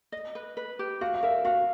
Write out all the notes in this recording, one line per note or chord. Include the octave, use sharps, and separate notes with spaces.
D#5
B4
B4
G4
F#4 F5
F5
A#4 E5
F#4 F5